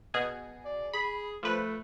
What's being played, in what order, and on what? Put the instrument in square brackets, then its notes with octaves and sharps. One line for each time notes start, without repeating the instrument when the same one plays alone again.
[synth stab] B2 G#4
[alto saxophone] D5
[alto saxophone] G#4 [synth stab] B5
[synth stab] F3 B4 [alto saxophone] A3